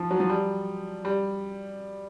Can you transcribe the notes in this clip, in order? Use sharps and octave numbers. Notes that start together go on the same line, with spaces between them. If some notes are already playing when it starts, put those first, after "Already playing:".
Already playing: F3
F#3
F3
G3
G3